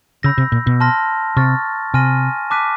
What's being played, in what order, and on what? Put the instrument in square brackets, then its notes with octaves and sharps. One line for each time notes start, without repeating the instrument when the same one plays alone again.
[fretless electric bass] C#3 [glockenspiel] B5 E6 G6 A#6
[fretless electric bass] C3
A#2
B2
[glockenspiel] A5 C6 F6 A#6
[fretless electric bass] C3 [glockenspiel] C#6 F6 A6
[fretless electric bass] C3 [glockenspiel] G#5 C6 F6 A#6 D#7
[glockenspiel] A5 D6 F#6 B6 D#7